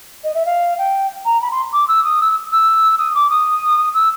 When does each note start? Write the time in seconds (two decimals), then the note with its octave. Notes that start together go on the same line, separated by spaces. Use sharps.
0.24 D#5
0.34 E5
0.46 F5
0.78 G5
1.25 A#5
1.41 B5
1.52 C6
1.73 D6
1.88 E6
2.04 D#6
2.21 E6
2.52 E6
2.99 D#6
3.15 D6
3.30 D#6
3.94 E6